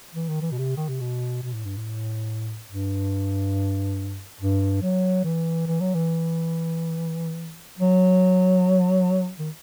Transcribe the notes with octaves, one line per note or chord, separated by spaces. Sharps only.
E3
D#3
E3
B2
C3
D#3
C3
B2
B2
A2
G2
A2
G2
G2
F#3
E3
E3
F#3
E3
F#3
D#3